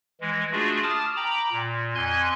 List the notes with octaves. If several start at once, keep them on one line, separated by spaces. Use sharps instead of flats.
E3 G#3
A3 D4 F4 F#4 G#4
A5 D6 D#6 F6 A6
G5 A#5 B5 D6
A#2
F2 G#5 C6 F#6 G#6